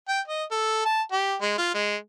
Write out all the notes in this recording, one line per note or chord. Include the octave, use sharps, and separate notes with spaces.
G5
D#5
A4
A5
G4
G#3
F4
G#3